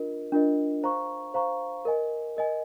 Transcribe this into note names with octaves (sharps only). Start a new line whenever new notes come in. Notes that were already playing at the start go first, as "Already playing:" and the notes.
Already playing: D4 F4 A#4 D#5
D4 F4 A#4 D#5
C5 F5 A#5 C#6
C5 F5 A#5 C#6
A#4 D#5 G#5
A#4 D#5 G#5